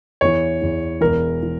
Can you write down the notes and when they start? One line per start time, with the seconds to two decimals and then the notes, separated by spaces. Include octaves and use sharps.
0.21 E2 E3 C#5
0.62 E2 E3
1.01 E1 E2 E3 A#4
1.43 E3